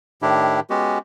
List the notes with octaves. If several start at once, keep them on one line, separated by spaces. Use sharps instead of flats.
A2 D#3 D4 E4 G4
G#3 B3 C#4 F#4 G4